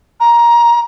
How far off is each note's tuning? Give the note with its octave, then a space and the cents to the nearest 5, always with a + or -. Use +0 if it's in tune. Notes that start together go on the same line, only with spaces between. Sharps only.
A#5 +15